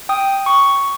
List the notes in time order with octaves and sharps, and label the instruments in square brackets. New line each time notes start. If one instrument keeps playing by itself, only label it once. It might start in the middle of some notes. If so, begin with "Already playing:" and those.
[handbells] G5 D#6
C#6